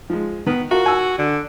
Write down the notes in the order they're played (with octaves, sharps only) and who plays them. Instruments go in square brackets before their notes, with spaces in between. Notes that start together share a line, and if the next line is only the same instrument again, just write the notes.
[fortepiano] F3 G#3
[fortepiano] D#3 [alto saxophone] B3
[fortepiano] F4 A#4 [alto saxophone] F#4
[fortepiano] G#5 E6
[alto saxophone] D3